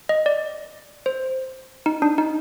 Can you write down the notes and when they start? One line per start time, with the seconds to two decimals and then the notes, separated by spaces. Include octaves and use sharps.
0.09 D#5
0.26 D5
1.06 C5
1.86 D#4
2.02 D4
2.18 D#4